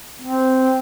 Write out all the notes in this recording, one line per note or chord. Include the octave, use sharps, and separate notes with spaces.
C4